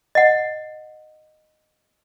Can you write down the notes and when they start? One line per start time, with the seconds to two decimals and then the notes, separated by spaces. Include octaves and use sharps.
0.15 D#5 F#5